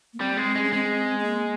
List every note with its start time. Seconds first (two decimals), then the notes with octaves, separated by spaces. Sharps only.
0.13 A#3
0.20 G3 C4
0.37 G#3
0.56 G#3
0.64 C#4
0.72 G#3 C4
1.19 C4
1.24 A#3